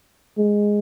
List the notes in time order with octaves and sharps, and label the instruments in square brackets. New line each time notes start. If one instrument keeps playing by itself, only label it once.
[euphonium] G#3